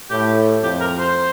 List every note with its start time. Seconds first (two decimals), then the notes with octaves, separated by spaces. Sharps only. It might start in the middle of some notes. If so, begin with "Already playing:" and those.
0.10 A2 G4
0.63 F2 G4
0.80 A#4
0.98 C5